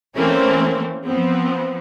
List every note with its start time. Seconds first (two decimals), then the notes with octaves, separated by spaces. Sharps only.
0.16 E3 A3 A#3 C4 C#4
1.04 F3 B3 C4